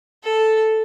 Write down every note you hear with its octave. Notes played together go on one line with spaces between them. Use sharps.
A4